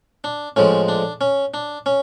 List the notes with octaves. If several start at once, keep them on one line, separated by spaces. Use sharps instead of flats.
D4
A2 F3 G#3 C#4
D4
C#4
D4
C#4